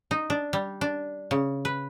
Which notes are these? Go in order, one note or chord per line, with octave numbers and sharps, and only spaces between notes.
D#4
D4
G3
D4
C#3
B4